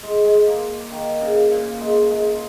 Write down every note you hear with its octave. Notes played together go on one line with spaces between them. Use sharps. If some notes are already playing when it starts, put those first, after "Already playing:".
G#3
G#3
A#3
D#3
C#3
A#2
G#3
G#3